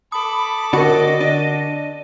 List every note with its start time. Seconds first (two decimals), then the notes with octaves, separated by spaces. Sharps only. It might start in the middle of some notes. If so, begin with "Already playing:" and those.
0.12 A4 B5 D6 D#6
0.73 D3 D4 F#4 A#4 D#5
1.21 D4 D#7